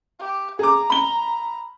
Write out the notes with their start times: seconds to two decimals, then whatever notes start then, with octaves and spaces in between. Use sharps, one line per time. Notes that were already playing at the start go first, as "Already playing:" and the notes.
0.19 G4
0.59 G#4 A#5 D6
0.90 B5 G7